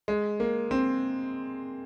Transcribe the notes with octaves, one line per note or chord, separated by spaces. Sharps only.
G#3
A#3
C4